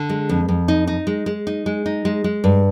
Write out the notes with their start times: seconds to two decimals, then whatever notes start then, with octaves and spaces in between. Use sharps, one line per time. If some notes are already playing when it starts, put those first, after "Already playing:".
Already playing: D3
0.09 G#3
0.29 F2
0.49 F2
0.68 D#4
0.87 D#4
1.07 G#3
1.26 G#3
1.47 D#4
1.66 G#3
1.86 D#4
2.05 G#3
2.24 G#3
2.44 G2